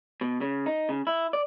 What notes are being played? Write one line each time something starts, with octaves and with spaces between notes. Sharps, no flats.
B2
C#3
D#4
C#3
E4
D5